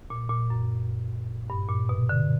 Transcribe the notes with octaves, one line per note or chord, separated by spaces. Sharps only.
A#2
A#2
F#2
G2
A#2
B2
D3